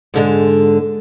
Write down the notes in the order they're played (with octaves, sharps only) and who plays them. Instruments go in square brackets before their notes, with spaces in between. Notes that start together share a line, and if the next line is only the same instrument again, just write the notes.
[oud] G#2 D3 G#3